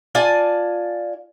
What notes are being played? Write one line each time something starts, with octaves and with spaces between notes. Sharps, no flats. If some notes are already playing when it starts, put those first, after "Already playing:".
F4 D5 G#5 A5